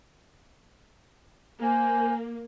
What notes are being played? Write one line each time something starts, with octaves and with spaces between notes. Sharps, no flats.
A#3 C5 G#5